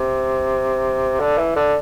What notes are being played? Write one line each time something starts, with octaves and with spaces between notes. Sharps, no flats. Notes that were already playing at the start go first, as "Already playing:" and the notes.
Already playing: C3
D3
E3
D3